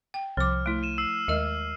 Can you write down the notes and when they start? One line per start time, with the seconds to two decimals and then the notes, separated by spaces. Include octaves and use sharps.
0.14 G5
0.37 C2 F3 D6 F6
0.66 A3 E4
0.83 D#7 E7
0.98 E6 C7
1.28 D#2 G#3 A#4 D#5